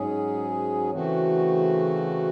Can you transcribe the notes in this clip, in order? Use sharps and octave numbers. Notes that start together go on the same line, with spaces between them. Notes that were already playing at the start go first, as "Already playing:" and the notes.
Already playing: G#2 F#3 C#4 G#4
C#3 E3 A3 C4 F#4